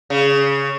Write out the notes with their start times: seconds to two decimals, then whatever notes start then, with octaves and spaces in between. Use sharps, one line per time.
0.10 C#3